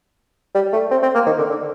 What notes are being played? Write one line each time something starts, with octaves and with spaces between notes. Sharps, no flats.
G3
A3
C4
C4
A#3
D#3
D3
D3